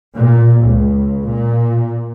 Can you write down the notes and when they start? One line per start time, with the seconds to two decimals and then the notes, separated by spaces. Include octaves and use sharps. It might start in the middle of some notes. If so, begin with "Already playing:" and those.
0.15 A#2
0.62 C#2
1.26 A#2